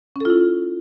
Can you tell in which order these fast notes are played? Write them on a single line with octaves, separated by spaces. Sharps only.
C#4 A4 F4 E4